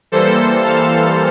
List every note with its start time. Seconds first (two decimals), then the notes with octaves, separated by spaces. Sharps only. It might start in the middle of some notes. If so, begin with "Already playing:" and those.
0.12 E3 G3 A#3 A4 C5
0.63 F5 A5